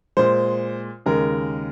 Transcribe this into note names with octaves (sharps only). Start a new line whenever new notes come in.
A#2 G#3 C5
D#2 C#3 G#3 A#4